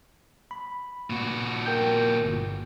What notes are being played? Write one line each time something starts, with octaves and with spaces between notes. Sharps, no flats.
B5
A#2 F#4
A#4 G5 G6
G1